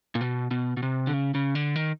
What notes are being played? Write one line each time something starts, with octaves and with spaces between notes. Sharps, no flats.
A#2
B2
B2
B2
C3
D3
C#3
C#3
D3
D#3